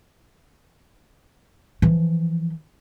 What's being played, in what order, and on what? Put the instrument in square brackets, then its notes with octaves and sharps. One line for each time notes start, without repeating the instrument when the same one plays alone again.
[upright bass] E3 F3